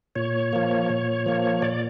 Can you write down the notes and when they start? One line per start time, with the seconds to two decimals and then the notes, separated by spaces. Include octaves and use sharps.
0.16 A#2 C#5
0.53 F3 A#3
0.89 A#2
1.26 F3 A#3
1.62 A#2 D5